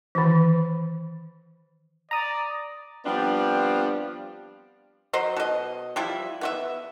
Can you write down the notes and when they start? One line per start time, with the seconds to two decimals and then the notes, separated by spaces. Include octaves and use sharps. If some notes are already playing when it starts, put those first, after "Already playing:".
0.15 D#3 E3
2.11 D5 A#5 D#6
3.06 F3 G3 B3 C4 D4 F4
5.13 F#3 C5 D#5
5.36 B2 D#5
5.96 F3 G3 E4
6.41 B3 F#4 E5